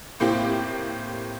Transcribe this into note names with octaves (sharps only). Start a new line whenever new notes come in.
A2 A#3 C4 G4